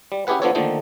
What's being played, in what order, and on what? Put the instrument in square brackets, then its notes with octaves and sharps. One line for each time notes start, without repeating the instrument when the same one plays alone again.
[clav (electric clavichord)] G3
C#4 E4 G4 G#4 B4 F#5
F3 B3 D4 A4 C#5
D3 D#3 F3 A3 A#3 D#4